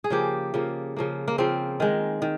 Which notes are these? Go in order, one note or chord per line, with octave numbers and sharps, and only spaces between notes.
G#4
C#3 F3 A#3 G4
C#3 F3 A#3
C#3 F3 A#3
A#3
C#3 F3 A#3 C4
D#3 G#3
D#3